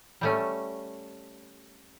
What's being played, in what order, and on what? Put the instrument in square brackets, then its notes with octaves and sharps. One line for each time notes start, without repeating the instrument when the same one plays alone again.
[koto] G3 A3 C#4